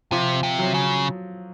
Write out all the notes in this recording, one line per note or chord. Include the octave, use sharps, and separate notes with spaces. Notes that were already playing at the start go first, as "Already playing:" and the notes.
C3 F3
C3
F#3
C#3